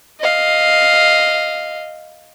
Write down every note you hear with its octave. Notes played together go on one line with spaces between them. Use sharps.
D#5 F5